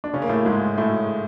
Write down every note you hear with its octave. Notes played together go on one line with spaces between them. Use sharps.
D4
C#3 C#4
A#3
A2 A3
G#2 G#3
A2 A3